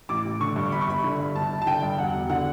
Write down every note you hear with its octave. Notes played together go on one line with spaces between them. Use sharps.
A1 D6
A1
D3 C#6
G2
G1 B5
C#6
G1 B5
D3
G2
G1 A5
G1
A5
D3 G5
G2
E1 F#5
E1
D3 F#5